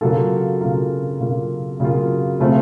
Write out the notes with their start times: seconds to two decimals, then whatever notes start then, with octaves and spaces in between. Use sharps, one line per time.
0.01 C#3 F#3 A#3 F4 A4
0.61 C#3 F#3 A#3 F4 A#4
1.20 C#3 F#3 A#3 F4
1.80 C#3 F#3 A#3 F4
2.40 C#3 A3 C4 F4